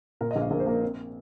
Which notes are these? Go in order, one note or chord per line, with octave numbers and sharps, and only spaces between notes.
A#2 A#4
D#5
A#1
F5
A#1 A#4
C5
A#3 A#4
C4